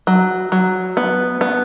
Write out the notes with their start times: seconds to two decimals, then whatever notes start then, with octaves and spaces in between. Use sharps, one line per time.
0.07 F#3
0.52 F#3
0.97 B3
1.41 B3